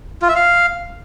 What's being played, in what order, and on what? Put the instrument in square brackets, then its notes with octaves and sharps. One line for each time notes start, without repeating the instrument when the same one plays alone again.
[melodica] F4
E5
F5